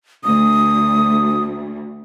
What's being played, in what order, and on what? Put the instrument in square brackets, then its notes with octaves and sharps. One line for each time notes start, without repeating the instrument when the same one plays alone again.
[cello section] D2 [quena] D#6